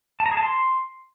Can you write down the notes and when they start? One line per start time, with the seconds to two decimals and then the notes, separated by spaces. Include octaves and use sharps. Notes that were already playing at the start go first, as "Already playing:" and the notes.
0.20 A5
0.26 A#5
0.31 G#4
0.37 A5
0.43 C6